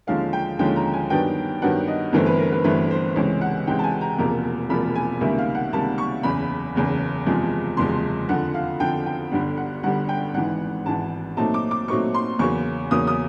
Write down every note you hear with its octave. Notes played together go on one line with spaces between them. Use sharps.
D#2 D3 F3 G#3 C#4 F5
G5
D#2 D3 F3 G#3 C#4 G5
A#5
G#5
G2 D#3 F#3 B3 D4 G5
G2 D#3 F#3 B3 D4 F#5
D#5
G1 G2 E3 A3 C4 A#4
B4
A#4
B4
G1 G2 E3 A3 C4 B4
C5
C#2 C3 E3 G#3 C#5
F#5
C#2 C3 E3 G#3 G5
A5
G#5
A#5
E1 E2 C3 F3 A#3 A#5
E1 E2 C3 F3 A#3 B5
G#5
C#2 C3 D#3 G3 A#3 E5
F5
F#5
C#2 C3 D#3 G3 A#3 A5
C#6
F#1 E2 C#3 B5
F#1 E2 C#3
F#1 E2 C3 F3 G#3
F#1 E2 C3 F3 G#3 C6
F2 D3 F3 F#5
F5
F2 D3 F3 G5
G5
G1 G2 D3 G3 F#5
F#5
G1 G2 D3 G3 F#5
G5
G#1 G#2 E3 F#5
G#1 G#2 E3 A5
A#2 F#3 A3 C4 D#4 A5
D6
D6
A#2 F#3 A3 C4 D#4 C#6
C6
E2 C#3 F#3 A#3 C#4 C#6
E2 C#3 F#3 A#3 C#4 D#6
D#6